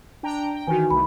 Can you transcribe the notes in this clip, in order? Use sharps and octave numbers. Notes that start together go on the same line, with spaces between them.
D4 G5 A#5
G5
D#3 E3 D#4 F#4 G#5
C2 A3 B5